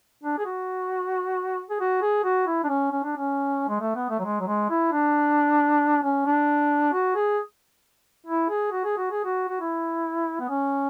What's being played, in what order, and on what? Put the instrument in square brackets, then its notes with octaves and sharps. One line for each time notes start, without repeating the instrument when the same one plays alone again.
[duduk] D4
G#4
F#4
G#4
F#4
G#4
F#4
E4
D4
C#4
C#4
D4
C#4
G#3
A3
B3
A3
F#3
G#3
F#3
G#3
E4
D4
C#4
D4
F#4
G#4
E4
G#4
F#4
G#4
F#4
G#4
F#4
F#4
E4
B3
C#4